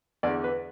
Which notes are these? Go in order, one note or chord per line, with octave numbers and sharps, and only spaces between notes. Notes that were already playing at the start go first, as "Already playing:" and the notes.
E2 D3 D5
B4